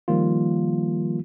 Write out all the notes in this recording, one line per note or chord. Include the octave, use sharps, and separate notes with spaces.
D#3 F3 G3 A#3 F4